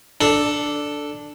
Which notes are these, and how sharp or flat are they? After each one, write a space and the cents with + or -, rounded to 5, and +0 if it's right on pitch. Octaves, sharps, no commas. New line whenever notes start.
D4 +0 A4 +0